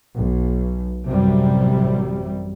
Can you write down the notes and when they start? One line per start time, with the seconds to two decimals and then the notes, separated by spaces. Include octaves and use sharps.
0.14 B1
1.05 A1 F#2 C3 F#3 G3